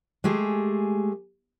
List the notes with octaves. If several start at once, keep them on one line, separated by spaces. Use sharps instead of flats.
G#3 A3 G4 G#4